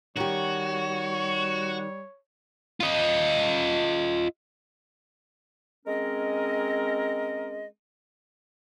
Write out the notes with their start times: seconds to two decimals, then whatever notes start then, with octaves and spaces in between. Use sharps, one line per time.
0.17 D#3 G3 C#4 F#4 G4 C#5
2.81 F4 D#5
5.86 G#3 C4 C#4 A#4 D#5